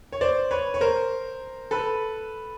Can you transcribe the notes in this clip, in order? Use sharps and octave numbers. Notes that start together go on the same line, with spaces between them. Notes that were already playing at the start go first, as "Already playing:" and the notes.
C#5
C5 D5
B4 C#5
C#5
A#4 C5
A4 B4